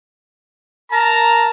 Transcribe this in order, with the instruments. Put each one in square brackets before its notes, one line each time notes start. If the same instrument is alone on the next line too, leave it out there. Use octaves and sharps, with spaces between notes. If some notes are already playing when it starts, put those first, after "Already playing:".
[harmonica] A#4 A5 [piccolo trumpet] A#5